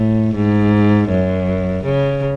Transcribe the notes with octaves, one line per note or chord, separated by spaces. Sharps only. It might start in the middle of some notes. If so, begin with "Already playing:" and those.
Already playing: A2
G#2
F#2
C#3